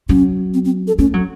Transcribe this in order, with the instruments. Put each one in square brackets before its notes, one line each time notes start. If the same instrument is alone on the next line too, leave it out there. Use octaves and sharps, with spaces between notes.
[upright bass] F#3 [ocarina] C#4
[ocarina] C4
C4
A4
[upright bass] A3 [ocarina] C#4
[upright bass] F#3